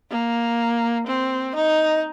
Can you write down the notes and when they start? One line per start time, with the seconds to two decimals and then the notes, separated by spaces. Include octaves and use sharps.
0.10 A#3
1.07 C4
1.55 D#4